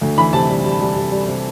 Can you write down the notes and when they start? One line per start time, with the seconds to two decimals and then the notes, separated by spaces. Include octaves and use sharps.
0.02 D2
0.18 E3 B5
0.33 C3 A5
0.49 G3
0.64 G3
0.81 G3
0.96 C3
1.12 G3
1.28 C3